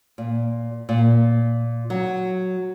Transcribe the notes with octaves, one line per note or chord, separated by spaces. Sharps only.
A#2
A#2
F#3